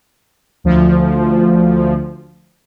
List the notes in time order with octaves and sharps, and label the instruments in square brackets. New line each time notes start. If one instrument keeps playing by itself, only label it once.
[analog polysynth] D2 F3